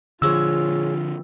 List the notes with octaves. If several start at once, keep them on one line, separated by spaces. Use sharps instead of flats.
A#2 D3 F3 G#3 F4 C#5 E6